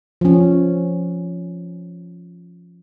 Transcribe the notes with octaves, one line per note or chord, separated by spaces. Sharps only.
F3 C#4